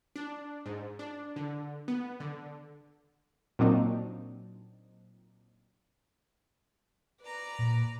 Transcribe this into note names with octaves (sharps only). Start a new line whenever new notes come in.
D4
G#2
D4
D3
B3
D3
A#2 F#3 C4 D4 D#4
B4 D5 A#5
A#2